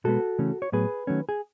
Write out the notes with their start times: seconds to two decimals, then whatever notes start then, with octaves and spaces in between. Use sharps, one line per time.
0.04 B2 G#3 B3 F#4 A4
0.39 C#3 E3 A3 C#4
0.62 C#5
0.72 A2 F#3 B3 G#4 B4
1.07 D#3 F#3 A3 C#4
1.29 G#4